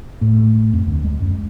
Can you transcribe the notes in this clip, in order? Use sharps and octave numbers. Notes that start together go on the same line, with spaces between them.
A2
F2
D2
G#3
F#2